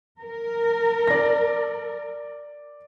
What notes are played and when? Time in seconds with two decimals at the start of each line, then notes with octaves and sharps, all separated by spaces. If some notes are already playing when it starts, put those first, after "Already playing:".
0.22 A#4
1.07 D5 A#6